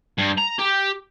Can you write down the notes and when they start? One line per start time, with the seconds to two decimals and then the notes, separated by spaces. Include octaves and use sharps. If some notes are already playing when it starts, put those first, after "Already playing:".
0.18 G2
0.38 A#5
0.59 G4